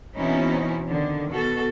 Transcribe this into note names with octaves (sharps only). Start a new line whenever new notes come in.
B2 E3 C4 C#4 D#4 E4
D3 D#3
B2 F#4 A4